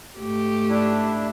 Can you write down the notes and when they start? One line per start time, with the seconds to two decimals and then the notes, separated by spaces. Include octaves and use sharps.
0.19 G#2 A3 G4
0.69 D4 E4